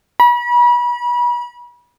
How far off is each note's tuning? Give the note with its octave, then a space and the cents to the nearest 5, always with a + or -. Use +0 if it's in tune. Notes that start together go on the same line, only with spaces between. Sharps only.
B5 -35